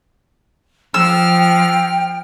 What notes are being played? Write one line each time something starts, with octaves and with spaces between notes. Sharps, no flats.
F3 G5 E6 F6